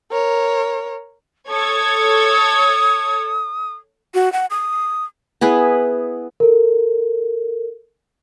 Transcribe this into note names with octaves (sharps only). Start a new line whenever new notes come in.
A#4 C#5
A4 C#5 D#6 G#6
F#4
F#5
D#6
B3 E4 G#4 B4
A4 A#4